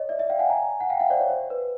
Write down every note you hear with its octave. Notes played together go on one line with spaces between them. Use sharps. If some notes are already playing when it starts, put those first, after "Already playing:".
Already playing: C#5 D#5
D5 E5
D5 E5
F5 G5
F#5 G#5
G#5 A#5
F#5
F5 G5
E5 F#5
C5 D5
C#5
C5
B4